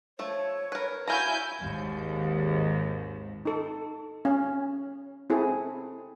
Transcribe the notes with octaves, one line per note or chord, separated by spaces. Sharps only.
F3 A3 C#5
A#4 B4
E4 F#4 F5 G#5 A#5 G6
G#1 D#2 G#2
D#4 A4
C#4
C4 E4 G#4 A4